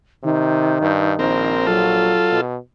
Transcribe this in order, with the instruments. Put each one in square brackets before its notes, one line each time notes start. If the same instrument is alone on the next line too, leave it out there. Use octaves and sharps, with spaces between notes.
[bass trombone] C3 [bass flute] D#3
[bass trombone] G2
[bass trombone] A#1 [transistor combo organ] C4 A#4
[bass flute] F#3 [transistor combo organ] F4 A4
[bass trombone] B2